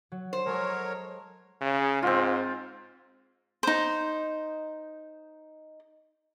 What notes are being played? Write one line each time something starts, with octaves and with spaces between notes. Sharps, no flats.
F#3
C5
F#3 G#3 A4 A#4 C#5
C#3
G#2 C4 F4
D#4 C5